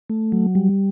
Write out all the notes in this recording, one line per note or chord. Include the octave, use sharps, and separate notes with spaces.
A3
F#3
G3